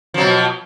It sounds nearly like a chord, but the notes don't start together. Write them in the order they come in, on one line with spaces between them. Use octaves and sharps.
F3 F#3 B2